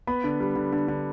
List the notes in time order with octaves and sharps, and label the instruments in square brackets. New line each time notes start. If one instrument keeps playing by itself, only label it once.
[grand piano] B3 B5
D3
G3
D3
D3
D3